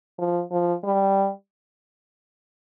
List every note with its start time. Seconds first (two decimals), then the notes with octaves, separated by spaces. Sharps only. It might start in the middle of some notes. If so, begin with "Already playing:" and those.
0.19 F3
0.51 F3
0.84 G3